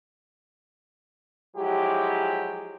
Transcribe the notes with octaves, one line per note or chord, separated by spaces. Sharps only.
F3 F#3 G#3 E4 G4